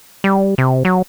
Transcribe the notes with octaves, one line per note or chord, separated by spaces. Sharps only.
G3
C3
F#3